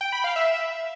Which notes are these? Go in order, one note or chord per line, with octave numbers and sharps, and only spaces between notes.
G5
B5
F5
E5